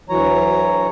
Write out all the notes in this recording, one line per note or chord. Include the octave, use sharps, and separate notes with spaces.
D2 E3 F#3 C#5 A#5